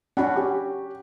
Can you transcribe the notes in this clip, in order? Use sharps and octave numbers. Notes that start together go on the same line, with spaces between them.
C#4 D4 F#4 F#5 B5
G4